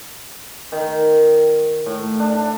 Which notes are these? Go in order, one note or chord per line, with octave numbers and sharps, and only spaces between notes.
D#3
A2
D4